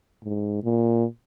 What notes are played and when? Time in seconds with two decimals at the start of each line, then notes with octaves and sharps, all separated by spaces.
0.24 G#2
0.64 A#2